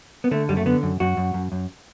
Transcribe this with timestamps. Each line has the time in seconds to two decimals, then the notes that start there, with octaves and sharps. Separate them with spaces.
0.24 B3
0.31 D3 A3
0.49 F#2 G3
0.57 A3
0.66 D3 B3
0.83 F#2
1.00 F#2 F#4
1.17 F#2
1.34 F#2
1.52 F#2